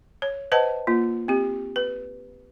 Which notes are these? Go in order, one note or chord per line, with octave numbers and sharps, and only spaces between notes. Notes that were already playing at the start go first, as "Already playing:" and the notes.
C#5
B4 C5 D#5 F#5 A5
A#3 F4
C4 G4
B4